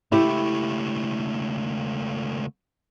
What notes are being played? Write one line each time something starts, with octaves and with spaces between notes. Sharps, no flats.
C#2 A3 E4 G4